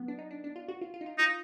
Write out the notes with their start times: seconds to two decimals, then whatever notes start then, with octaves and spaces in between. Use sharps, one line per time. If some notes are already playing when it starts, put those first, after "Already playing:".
Already playing: F#3 B3
0.08 D4
0.19 D#4
0.31 D4
0.44 D4
0.56 F4
0.68 F#4
0.81 F4
0.94 F4
1.01 D#4
1.06 F4
1.18 D#4 F4